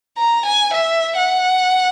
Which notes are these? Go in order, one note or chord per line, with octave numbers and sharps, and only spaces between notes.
A#5
G#5
E5
F#5